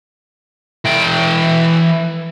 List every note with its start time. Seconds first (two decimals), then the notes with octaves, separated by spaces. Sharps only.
0.85 E3 G5